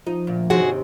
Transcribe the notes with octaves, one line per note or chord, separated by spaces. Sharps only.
F3 D#4
D2 A#2
D#2 G#2 C3 F#4 G#4 F#5